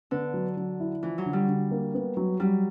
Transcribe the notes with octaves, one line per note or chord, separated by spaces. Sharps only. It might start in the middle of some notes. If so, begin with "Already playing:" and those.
D3 B3
F#3
F#3
E4
E3 F3
F#3
D3
G3
D3
A#3
B3
F#3
F#3 G3